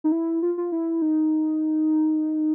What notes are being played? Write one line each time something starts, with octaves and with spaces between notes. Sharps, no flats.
D#4
E4
F4
F4
E4
D#4